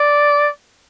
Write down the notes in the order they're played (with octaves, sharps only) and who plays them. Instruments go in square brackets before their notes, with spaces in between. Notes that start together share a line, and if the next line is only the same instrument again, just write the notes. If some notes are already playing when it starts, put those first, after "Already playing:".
Already playing: [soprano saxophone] D5